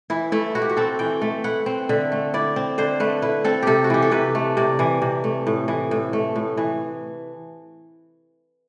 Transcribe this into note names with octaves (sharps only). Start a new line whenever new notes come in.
E3 E4
A3 E4
E4 F#4
G4
F#4
C4 A4
E3 G5
A3
E4 F#5
C4
D3 E5
A3
E4 D5
C4
D3 C5
A3 B4
E4 B4
C4 A4
C3 G4 A4
F#4
E3 G4
A4
C3 B4
A3
C3 D5
E3
C3
A3
A2
E3
A2
A3
A2
E3